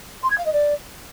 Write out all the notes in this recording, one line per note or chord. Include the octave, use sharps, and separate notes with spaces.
C6
G#6
F5
D#5
D5